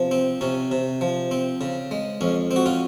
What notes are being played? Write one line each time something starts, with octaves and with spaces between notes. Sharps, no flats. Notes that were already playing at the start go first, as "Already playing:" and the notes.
Already playing: C3 F3
C4
C3 C#4
C3
F3
C4
C#3
G#3
F2 C#4
C4
F#4
C#4 F4